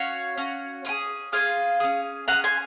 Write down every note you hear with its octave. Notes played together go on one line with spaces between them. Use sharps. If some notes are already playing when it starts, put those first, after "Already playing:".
Already playing: C#4 F#4 C#5 F5
C#4 F#4
C#4 F4 G#4
C#4 F4 G#4 F5 G#5
C#4 G#4
C#4 G#4 F#5 A#5
G#5 C6